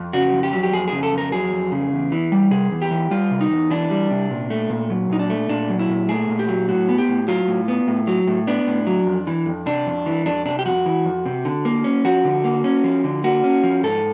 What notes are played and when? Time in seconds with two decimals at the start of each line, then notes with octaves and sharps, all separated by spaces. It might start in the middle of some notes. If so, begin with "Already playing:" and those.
Already playing: F2
0.13 C#3 F#4
0.33 F2
0.43 G4
0.53 F#3
0.63 G4
0.73 F2 G#4
0.88 C#3 G#4
1.03 A4
1.13 F2 A#4
1.32 F#3 G#4
1.52 F2
1.72 C#3
1.92 E2
2.12 E3
2.32 G3
2.51 C3 G#4
2.72 E2
2.81 G4
2.91 E3
3.11 G3 F4
3.31 C3
3.41 D#4
3.50 E2
3.71 E3 D4
3.91 G3
4.11 C3
4.30 A#2
4.50 A3
4.70 A#2
4.90 F#3
5.10 A#2 D#4
5.19 D4
5.29 A3
5.49 A#2 D4
5.69 F#3
5.79 E4
5.89 A#2
6.09 A3 G#4
6.29 A#2
6.39 G4
6.49 F#3
6.68 A2 F#4
6.89 B3
6.98 G4
7.09 A2
7.28 F#3 F4
7.48 A2
7.68 B3
7.87 A2
8.07 F#3
8.27 A2
8.47 B3 D4
8.67 A2
8.87 F#3
9.07 F2
9.27 E3
9.46 F2
9.66 C3 D4
9.87 F2
10.06 E3
10.26 F2 D4
10.46 C3 D4
10.59 G4
10.65 F2 F#4
10.86 E3
11.05 F2
11.26 C3
11.45 D3
11.65 A#3
11.84 C#4
12.05 F3 F#4
12.25 D3
12.44 A#3
12.64 C#4
12.84 F3
13.04 D3
13.24 A#3 F#4
13.44 C#4
13.64 F3
13.84 G#2 A4